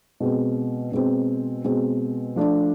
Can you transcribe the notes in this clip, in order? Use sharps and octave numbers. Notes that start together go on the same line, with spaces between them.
B2 G#3 C4
B2 G#3 C4
B2 G#3 C4
F3 A3 D4